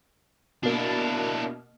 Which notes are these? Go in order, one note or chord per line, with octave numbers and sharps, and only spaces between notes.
B2 A#3 D4 E4